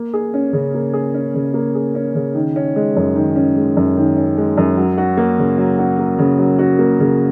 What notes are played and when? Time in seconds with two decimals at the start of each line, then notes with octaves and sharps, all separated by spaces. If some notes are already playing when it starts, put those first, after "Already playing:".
Already playing: A#3
0.14 G#4
0.34 C#4
0.53 C#3
0.74 A#3
0.93 G#4
1.14 C#4
1.35 C#3
1.54 A#3
1.75 G#4
1.95 C#4
2.15 C#3
2.35 D#3
2.56 C#4
2.76 G#3
2.96 F#2
3.16 D#3
3.36 C#4
3.56 G#3
3.77 F#2
3.97 D#3
4.17 C#4
4.37 G#3
4.57 F#2
4.77 F#3
4.98 F#4
5.17 A#3
5.38 C#3
5.58 F#3
5.79 F#4
5.99 A#3
6.19 C#3
6.39 F#3
6.59 F#4
6.79 A#3
7.00 C#3